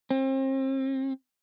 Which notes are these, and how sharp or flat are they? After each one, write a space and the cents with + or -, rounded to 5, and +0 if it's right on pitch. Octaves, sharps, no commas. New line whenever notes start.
C4 +35